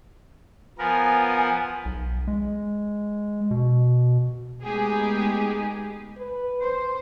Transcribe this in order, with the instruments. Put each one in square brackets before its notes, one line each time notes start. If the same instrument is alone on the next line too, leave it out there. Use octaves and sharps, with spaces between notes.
[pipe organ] F3 B3 A#4 [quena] G#5
[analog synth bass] B1
G#3
B2
[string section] G#3 A3 B3 D#4 G4 G#4
[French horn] B4
[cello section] C5